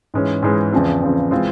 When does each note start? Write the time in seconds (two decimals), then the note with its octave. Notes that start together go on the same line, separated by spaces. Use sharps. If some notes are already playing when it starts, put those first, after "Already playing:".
0.14 G#2 E3 G#3 C#4
0.42 G#2 E3 G#3 C#4
0.73 E2 C#3 F3 C4
1.02 E2 C#3 F3 C4
1.31 E3 G#3 C4 F4